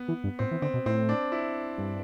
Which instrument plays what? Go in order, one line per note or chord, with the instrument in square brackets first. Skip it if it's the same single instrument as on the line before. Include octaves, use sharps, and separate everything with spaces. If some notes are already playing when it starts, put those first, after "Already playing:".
Already playing: [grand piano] B3
[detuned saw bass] E3
G2
[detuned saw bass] A2 [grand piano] C4
[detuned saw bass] E3
[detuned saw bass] D3 [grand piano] C4
[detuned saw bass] B2
[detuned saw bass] A2 [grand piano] C4
[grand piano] D4
E4
[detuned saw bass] G2